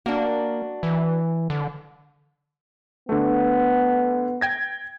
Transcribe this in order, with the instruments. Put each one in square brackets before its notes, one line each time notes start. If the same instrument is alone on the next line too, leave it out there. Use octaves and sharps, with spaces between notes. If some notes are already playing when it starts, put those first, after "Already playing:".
[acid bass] A#3 [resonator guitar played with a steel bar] D4 F#4
[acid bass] E3
D3
[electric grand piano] D3 A3 [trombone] B3
[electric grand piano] G5 G#6 A#6